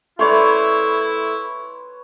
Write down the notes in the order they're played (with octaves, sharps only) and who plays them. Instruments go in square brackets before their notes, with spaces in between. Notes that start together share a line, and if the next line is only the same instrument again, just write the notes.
[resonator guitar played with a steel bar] A3 D5 [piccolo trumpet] E4 [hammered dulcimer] B4 C#5 C6